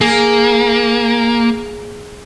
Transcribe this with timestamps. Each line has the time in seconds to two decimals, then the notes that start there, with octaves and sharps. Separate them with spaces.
0.01 A#3 G#4